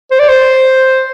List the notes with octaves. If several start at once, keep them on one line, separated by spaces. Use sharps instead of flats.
C5
D5
C5